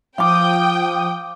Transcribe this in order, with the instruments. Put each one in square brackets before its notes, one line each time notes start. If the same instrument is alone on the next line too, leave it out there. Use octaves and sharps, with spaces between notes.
[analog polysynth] F3 D#6 [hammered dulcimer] F5 D6 [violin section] G5